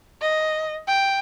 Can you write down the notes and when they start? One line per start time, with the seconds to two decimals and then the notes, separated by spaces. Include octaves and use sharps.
0.22 D#5
0.87 G5